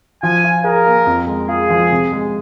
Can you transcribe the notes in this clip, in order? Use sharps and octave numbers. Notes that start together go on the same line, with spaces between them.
F3 G#5
F4
G#4 A#4
A#3
F2
G#3
F4 G#4
F3
C3
G#3